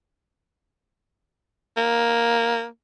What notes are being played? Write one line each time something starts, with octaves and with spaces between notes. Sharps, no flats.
A#3